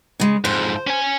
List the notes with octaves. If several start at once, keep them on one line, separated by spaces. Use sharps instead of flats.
C#3 G#3
F2 G#2 C5
C#4 G#5